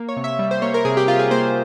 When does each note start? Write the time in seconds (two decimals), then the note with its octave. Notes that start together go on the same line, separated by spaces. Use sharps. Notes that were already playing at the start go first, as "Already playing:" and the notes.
Already playing: A#3
0.09 C#5
0.17 C3
0.24 E5
0.39 G3
0.51 C5
0.62 A#3 C#5
0.74 A#4
0.85 C3 G#4
0.97 G4
1.08 C3 F4
1.19 G#4
1.31 A#3 C5